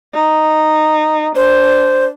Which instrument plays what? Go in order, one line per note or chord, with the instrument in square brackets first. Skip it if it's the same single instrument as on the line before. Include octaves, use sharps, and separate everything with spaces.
[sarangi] D#4
[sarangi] D4 [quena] C5